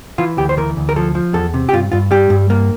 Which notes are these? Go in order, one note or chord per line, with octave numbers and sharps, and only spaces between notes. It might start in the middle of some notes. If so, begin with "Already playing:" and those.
E3 F4
D2 G4
C5
E3 A#4
D2
A#4
F3 A4
F3
E2 A4
C3
G4
G2 F4
G2 F4
G3 G4
G2
A#3